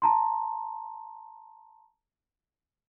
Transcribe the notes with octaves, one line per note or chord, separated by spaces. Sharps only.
A5 A#5 C6